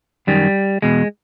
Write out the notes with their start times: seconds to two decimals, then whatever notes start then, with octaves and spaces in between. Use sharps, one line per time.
0.27 F#2 D#3 G3
0.82 E2 B2 G#3